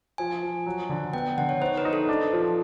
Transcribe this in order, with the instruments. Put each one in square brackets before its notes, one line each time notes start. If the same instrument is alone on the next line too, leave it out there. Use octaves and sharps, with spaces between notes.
[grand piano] F3 [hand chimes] G#5
[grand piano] F3
F#3
D3
[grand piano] B3 [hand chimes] G5
[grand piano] D3 [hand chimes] F#5
[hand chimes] C#5
[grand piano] D#4 [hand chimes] C5
[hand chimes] B4
[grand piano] D#4
[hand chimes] A4
[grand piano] D4
F3